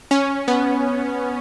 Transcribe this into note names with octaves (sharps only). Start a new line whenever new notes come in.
C#4
B3